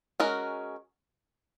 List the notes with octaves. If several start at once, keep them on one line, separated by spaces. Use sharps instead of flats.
G#3 C#4 F#4 A#4